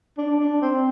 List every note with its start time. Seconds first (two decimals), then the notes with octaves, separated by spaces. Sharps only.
0.18 D4
0.39 D4
0.62 C4